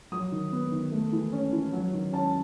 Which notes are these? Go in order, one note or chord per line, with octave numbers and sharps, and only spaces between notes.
F#3 D#6
D#3
B3
D#3
A3
E3
C#4
E3
F#3
D#3
C#4 A5